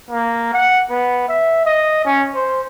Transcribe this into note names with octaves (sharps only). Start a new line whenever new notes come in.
A#3
F#5
B3
E5
D#5
C#4
C5